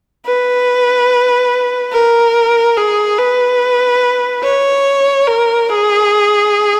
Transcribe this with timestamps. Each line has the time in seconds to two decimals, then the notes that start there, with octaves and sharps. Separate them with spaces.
0.26 B4
1.93 A#4
2.77 G#4
3.18 B4
4.44 C#5
5.27 A#4
5.69 G#4